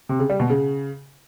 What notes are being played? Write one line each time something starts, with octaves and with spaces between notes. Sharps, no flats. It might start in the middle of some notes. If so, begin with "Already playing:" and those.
C3
C#3
G3
B2
C#3